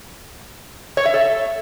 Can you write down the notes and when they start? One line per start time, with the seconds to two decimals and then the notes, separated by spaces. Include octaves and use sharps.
0.97 C#5
1.05 E5
1.14 A4